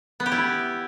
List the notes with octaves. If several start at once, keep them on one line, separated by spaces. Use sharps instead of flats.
B3
G4
E4